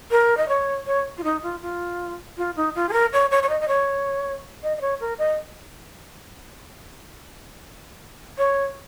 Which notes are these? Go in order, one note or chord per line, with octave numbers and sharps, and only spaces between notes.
A#4
D#5
C#5
C#5
F4
D#4
F4
F4
F4
D#4
F4
G#4
A#4
C#5
C#5
C#5
D#5
D#5
C#5
D#5
D#5
C#5
A#4
D#5
C#5